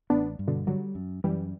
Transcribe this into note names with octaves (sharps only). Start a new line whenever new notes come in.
A1 B3 D4
G2
B2 D3
D3 F#3 G3
F#2
F#2 E3 G3